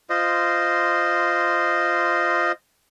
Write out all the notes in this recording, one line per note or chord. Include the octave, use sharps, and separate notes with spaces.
F4 C5 D#5